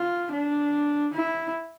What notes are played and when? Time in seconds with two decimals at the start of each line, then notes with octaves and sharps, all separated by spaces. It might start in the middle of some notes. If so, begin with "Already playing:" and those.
Already playing: F4
0.33 D4
1.14 E4